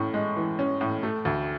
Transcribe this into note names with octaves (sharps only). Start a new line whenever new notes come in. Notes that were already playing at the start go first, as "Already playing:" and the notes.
Already playing: A2 C#4
G#3
E3
C#4
A2
A3
D2